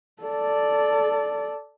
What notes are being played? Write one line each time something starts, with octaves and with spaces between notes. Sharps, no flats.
A4 D5